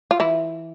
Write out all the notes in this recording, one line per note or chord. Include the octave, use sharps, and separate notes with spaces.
F4
E3 E4